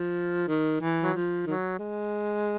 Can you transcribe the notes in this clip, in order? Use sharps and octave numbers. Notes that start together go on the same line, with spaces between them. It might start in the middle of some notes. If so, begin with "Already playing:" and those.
Already playing: F3
D#3
E3
F#3
F3
D#3 F#3
G#3